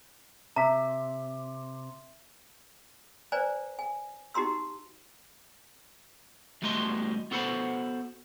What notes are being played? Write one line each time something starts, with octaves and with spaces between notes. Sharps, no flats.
C3 E5 A#5 B6
B4 C5 D5 G#5 A#5
G#5
D#4 F#4 G4 A#5 C6 E6
E2 G3 A3 F#4 D#5 C6
B3 F#4 A4 C5 F#5 B5